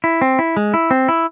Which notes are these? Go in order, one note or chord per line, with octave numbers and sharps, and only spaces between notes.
E4
C4
E4
G#3
E4
C4
E4